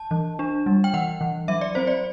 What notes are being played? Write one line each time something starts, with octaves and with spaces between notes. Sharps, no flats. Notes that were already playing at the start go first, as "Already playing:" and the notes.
Already playing: A5
E3
D4
G3
G5
E3 F#5
E3
F#3 E5
D5
C4 C5
D5